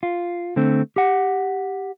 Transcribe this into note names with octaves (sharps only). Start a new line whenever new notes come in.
F4
D3 A3 C4
G4 F#5